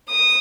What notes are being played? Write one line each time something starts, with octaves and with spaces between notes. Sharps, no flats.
D#6